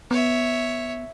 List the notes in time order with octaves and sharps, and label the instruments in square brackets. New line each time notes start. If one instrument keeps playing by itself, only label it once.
[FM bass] B3 [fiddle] C#5 E5